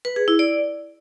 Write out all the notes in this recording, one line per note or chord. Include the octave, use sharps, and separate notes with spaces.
B4
G#4
E4
D5